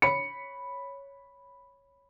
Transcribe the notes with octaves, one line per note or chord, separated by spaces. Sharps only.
C#5 B5 C#7